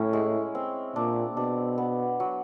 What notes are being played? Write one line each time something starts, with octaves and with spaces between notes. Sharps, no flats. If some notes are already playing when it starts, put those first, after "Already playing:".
Already playing: A2 C#4 E4
G#3
C4
A#2 D4
B2 D4
B3
F#3